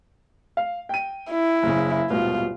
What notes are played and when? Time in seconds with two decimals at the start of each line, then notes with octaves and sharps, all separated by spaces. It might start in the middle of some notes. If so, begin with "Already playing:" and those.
0.57 F5
0.89 G5 D#7
1.31 E4
1.63 F#1 C#3
2.10 D#1 G#1 B2 F4